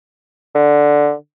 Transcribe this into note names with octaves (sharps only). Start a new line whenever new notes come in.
D3